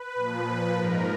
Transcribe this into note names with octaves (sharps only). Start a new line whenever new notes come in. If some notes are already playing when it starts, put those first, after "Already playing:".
Already playing: B4
A#2 F3
G#2 F3 A#4